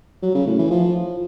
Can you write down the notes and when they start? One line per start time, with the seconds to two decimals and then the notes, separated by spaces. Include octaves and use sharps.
0.23 F#3
0.35 C#3
0.46 A2
0.58 E3
0.70 F3